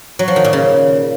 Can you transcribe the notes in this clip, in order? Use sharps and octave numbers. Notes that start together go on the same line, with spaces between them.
F#3
F3
D#3
A#2
C#3